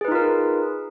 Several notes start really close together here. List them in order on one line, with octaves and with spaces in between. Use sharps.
G#4 B4 D#4 F4 A#4